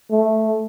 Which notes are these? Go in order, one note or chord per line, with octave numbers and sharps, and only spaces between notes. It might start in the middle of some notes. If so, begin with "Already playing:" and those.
A3